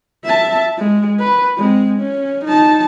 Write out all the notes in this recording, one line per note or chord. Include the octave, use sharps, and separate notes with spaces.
E5 A5
G#3
B4
G#3 C4
C#4
D#4 A5